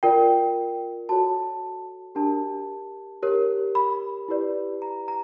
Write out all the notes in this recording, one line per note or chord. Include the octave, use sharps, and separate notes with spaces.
F4 A#4 D5 G5
F#4 A4 C#5 A5
D4 G4 A#4 A5
G4 A#4 C#5
B5
E4 G4 B4 D5
A#5
A#5